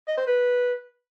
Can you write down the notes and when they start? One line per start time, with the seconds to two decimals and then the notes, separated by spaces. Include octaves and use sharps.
0.08 D#5
0.17 C5
0.27 B4